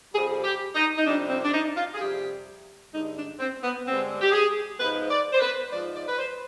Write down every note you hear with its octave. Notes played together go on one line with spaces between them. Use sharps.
F2 C3 G3 G#4
G4
D#4
D#4
F2 C3 G3 D4
C4
D4
D#4
F4
G#4
F2 C3 G3 G4
G2 D3 G#3 D#4
D4
C4
B3
G2 D3 G#3 C4
G4
G#4
G#2 F3 G#3 B4
D5
C5
B4
G#2 F3 G#3 D5
D5
B4
C5